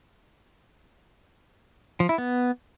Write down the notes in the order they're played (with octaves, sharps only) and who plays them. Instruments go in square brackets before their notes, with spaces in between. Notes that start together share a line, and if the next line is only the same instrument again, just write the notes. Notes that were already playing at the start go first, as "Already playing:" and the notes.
[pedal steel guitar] F3
E4
B3